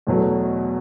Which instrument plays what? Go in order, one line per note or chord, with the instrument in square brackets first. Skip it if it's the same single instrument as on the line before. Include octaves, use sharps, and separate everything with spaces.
[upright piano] E2 B2 F#3 A3